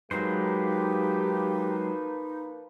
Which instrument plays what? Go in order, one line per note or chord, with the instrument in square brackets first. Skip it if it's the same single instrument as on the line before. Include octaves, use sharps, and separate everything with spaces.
[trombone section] F3 A#3 B4 [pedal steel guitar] F#3 G#3 C5 [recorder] D#4 [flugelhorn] G4